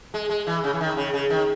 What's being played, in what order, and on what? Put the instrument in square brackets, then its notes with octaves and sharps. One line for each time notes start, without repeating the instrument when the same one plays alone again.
[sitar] G#3
G#3
E3
C#3
E3
D#3
C#3
C#3
D#3